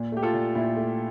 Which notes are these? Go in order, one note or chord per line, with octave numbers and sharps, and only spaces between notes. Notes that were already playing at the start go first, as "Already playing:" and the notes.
Already playing: A#2
A3 G4
F4 A4
A#2
A#2 E4
A3